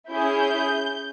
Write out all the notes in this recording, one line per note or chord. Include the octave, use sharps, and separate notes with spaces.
C#4 E4 G#4 G6